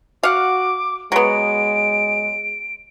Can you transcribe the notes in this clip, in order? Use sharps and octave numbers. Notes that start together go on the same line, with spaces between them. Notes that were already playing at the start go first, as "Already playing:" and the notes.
F#4 F5 F#5 D6
F#3 G#3 B3 D7